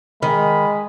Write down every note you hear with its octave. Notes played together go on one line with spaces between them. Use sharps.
D#3 G#3 B5